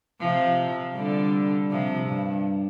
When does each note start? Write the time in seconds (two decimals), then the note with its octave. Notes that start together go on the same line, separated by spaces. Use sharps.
0.20 C3 F3
0.96 D3 G3
1.71 C3 F3
2.09 G2